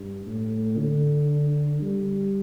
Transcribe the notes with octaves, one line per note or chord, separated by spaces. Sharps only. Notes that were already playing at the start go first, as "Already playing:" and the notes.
Already playing: G2
A2
D3
G3